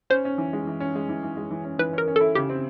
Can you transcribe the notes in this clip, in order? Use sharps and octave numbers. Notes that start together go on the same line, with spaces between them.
C#4 C5
C#4
E3
G#3
E3
C#4
G#3
E3
E3
G#3
E3
C#4
E3 B4
C#4 A#4
C#4
E4 A4
C#3 G4
C4